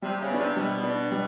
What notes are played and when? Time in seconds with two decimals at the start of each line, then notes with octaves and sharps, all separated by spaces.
0.02 C3 G3
0.20 C#3
0.29 B3
0.34 C3 D4
0.57 B2 G3
0.83 B3 D4
1.11 G3